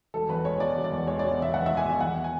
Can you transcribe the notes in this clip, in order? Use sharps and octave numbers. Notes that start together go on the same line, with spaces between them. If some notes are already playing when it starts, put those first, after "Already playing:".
E1 A4
E2 B4
G#3 C#5
B2 D5
E1
D5
E2
G#3 C#5
D5
B2
E1 E5
E2 F#5
E5
G#3
G#5
B2 E5
E2 F#5
B2
G#5